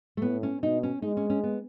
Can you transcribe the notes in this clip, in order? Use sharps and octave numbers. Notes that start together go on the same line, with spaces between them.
A3
A2 B3
C#4
B2 D#4
C#4
G#3 D#4
C#4
C#4
B3